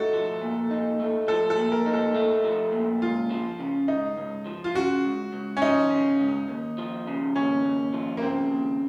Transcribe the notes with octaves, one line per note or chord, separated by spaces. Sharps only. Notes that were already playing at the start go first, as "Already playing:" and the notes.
Already playing: A3 D#4 F#4 A4
F3
A#2
D#4
A3
F3 A4
A4
A#2
A#4
D#4
A4
A3
F3
A#2
C#2 F4
F3
C#3
C#2 D#4
C#2
F3
F4
C#3 F#4
C#2
C#2
C#4
F3 D#4
C#3
C#2
D#2
F3
C#3
D#2 C#4
D#2
F3
A#3
C#3 C4
D#2